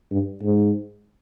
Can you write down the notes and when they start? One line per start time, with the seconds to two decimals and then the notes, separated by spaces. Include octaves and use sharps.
0.12 G2
0.43 G#2